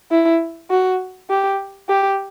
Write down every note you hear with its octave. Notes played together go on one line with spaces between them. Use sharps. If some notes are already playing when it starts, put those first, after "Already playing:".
E4
F#4
G4
G4